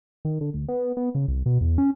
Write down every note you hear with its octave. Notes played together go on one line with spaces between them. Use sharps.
D#3
D3
D2
B3
B3
C#3
C2
B2
E2
C#4